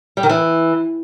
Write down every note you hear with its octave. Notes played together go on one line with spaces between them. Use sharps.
G3
D#3
E3